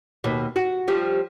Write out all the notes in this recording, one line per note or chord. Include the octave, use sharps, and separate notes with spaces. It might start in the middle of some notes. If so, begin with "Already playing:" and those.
D#2 B2
F#4
F3 G3